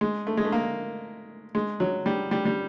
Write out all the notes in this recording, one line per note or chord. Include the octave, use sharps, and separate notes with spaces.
G#3
A3
G#3
A3
A#3
G#3
F#3
G3
G3
G3